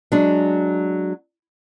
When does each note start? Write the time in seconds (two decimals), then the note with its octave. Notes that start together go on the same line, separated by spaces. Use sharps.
0.12 F#3 G#3 D4